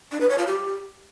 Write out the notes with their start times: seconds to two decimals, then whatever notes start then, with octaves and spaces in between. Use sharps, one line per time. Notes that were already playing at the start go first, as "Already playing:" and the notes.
0.12 D4
0.21 B4
0.29 C#5
0.38 F4
0.47 G4